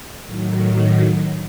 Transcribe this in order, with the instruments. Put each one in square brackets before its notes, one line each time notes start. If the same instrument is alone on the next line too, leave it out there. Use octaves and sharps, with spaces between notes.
[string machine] A2 D#3 F#3